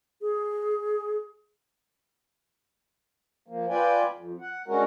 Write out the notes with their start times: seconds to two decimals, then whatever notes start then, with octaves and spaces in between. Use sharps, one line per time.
0.21 G#4
3.48 F3 A#3
3.69 F4 B4 D5 G5 G#5
4.15 F2
4.41 F#5
4.68 D3 G#3 C#4 F#4 A#4